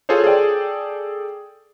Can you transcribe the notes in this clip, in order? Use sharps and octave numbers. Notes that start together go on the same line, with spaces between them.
F4 G#4 A4 C5 C#5
G#4 A4 D5 G5